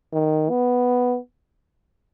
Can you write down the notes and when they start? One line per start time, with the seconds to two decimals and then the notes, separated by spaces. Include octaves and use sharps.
0.13 D#3
0.50 B3